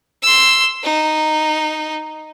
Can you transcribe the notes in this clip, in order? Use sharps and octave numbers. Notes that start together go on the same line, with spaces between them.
C6 E6
D#4